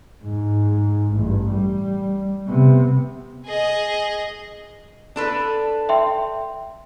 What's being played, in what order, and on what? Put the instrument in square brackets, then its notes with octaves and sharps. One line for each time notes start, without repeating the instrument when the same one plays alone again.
[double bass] G#2
A1 G2
G3
C3 B3
[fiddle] G#4 D#5
[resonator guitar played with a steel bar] D4 A4 B4
[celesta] E5 G5 C6